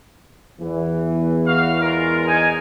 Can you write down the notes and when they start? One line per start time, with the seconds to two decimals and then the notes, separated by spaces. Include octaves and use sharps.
0.60 E2 E3
1.47 F#4 F5
1.81 G#3 F4 A#4
2.27 D#4 G#5